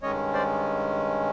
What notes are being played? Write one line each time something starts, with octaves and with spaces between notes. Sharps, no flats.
G2 D#3 G#3 C#4 C#5 D#5
C5 D5